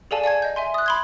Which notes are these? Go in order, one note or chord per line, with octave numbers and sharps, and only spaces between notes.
G#4 A4 D5 F5 G#5 A5
D5 F5 G#5 G#6
D#5 G6
E5 G#5 C6
D#6 F#6
B5 C6 G#6